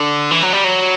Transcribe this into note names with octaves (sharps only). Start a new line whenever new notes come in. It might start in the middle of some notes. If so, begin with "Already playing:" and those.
Already playing: D3
E3
F#3
G3
F#3